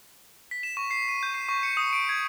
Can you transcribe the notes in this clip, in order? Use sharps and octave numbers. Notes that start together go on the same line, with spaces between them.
B6
E7
C#6
C7
D#7
G6
C7
C#6
C#7
D#6
D7
G#6